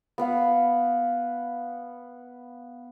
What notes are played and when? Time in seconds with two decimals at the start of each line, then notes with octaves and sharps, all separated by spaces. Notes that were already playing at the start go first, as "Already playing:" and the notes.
0.18 B3 B4 F5 F#5